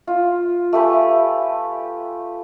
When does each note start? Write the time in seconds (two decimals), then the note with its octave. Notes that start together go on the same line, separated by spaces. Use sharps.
0.07 F4
0.73 A3 G4 B4 G#5